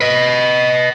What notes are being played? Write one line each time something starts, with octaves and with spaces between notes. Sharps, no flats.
B4 D#5